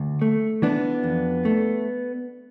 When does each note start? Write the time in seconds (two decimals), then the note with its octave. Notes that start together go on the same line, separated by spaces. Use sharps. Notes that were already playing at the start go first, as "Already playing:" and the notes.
Already playing: D2
0.22 A3
0.62 E3 B3 D4
1.03 F2
1.45 A3